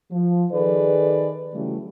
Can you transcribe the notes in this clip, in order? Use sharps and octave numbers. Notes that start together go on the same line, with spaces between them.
F3
D#3 G#4 A4 B4 D5
C#3 E3 F#3 G3 A3